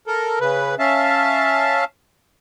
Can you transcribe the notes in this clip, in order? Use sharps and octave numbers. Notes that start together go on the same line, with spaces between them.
A4 A#4
C#3 B4
C#4 E5 F5 A5